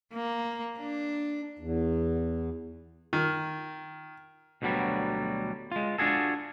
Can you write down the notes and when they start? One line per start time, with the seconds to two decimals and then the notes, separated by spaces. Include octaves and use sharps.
0.13 A#3
0.78 D4
1.59 E2
3.13 D#3
4.62 D2 B2 D3 F#3 G3
5.72 G#3 F4
5.98 D4 F4 F#4 G#4 A4